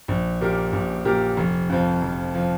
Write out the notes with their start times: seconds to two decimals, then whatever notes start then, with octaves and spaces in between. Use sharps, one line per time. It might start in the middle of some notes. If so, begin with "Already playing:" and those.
0.08 A#1
0.41 A#2 A#3 G4 A#4
0.73 A#1
1.05 A#2 A#3 G4 A#4
1.37 F1
1.69 F2 F3
2.02 F1
2.35 F3